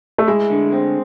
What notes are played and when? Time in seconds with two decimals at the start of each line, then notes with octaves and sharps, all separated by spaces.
0.18 A3
0.27 G#3 E4
0.50 D3
0.72 C4